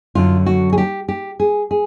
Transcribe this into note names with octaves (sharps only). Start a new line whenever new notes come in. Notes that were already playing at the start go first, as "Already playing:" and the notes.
F#2 D3 F#3 F4
F#4
G#4
G4
G4
G#4
G#4